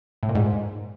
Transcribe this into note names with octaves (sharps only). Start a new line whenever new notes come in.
A2
A#2
G#2